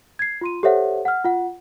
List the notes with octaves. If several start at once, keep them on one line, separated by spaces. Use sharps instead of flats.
G#6 C7
F4 C6 D#7
G4 A4 C5 C#5 E5 F#5
F#5 F6
F4 F#5